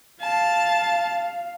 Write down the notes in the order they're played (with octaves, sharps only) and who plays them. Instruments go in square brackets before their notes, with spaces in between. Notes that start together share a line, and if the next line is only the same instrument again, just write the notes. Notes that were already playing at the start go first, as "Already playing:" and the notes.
[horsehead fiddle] F5 [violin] A5